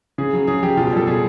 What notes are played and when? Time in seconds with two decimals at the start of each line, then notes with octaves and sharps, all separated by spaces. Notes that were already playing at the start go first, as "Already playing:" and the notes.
0.18 C#3 G#4
0.33 F#3
0.47 C#3 G#4
0.63 F#3 G4
0.77 B2 F4
0.87 G4
0.92 G3 A4
1.07 B2 G#4